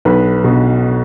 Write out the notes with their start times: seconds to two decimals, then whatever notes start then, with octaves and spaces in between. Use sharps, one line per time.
0.05 B1 B4
0.44 B2